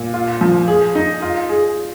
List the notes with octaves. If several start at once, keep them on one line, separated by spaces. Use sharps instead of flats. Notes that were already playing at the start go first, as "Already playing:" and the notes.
Already playing: A#2
F4
F3
G#4
D#4
F4
G#4